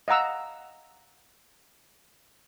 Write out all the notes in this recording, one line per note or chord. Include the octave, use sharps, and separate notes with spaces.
D#5 F5 F#5 A#5 E6